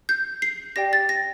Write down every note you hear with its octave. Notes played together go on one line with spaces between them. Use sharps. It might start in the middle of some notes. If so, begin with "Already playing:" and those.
G6
C7
G4 D5 G5 A#6
A6
A#6